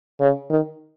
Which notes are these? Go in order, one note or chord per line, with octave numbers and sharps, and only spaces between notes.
C#3
D#3